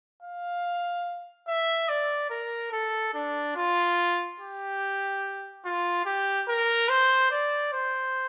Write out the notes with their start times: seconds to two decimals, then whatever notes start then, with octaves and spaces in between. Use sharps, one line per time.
0.23 F5
1.48 E5
1.89 D5
2.31 A#4
2.72 A4
3.14 D4
3.56 F4
4.40 G4
5.65 F4
6.06 G4
6.48 A#4
6.89 C5
7.31 D5
7.73 C5